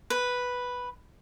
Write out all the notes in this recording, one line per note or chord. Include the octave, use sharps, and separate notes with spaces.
B4